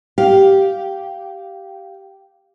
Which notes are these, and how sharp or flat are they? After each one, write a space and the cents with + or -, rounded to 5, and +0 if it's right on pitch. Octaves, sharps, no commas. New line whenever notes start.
G4 -10 F5 -5